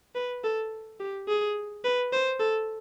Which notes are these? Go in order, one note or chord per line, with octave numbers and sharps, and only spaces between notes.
B4
A4
G4
G#4
B4
C5
A4